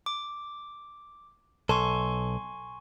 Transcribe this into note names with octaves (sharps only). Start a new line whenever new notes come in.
D6
B1 A4 G#5 C6 C#6